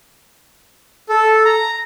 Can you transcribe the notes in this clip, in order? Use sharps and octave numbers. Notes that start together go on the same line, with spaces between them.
A4
A#5